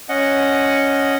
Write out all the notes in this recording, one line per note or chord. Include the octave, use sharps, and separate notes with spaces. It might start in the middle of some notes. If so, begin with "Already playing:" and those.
C#4 D#5 F#5